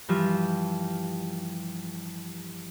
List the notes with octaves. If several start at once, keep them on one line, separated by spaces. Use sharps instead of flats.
G2 E3 F3 F4 G4 E5